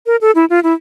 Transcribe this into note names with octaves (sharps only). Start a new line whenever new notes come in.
A#4
A4
E4
F4
E4